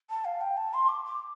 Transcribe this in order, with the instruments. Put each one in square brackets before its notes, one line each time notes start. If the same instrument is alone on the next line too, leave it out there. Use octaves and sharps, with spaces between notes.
[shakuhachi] A5
F5
G5
A5
C6
D6
D6